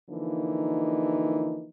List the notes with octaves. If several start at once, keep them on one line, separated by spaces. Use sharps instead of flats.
D3 E3 F3 A#3 D#4